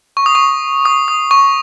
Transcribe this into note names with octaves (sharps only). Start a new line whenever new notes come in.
C#6
D#6
C#6
D#6
D#6
C#6